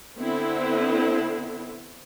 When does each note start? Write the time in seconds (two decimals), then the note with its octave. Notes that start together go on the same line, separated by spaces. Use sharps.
0.17 D3 B3 C4 E4